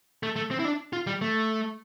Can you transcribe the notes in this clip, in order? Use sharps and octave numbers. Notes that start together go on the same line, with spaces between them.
A3
A3
C4
E4
D4
F4
G3
A3